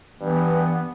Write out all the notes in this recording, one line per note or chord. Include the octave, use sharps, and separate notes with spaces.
G2 E3 B3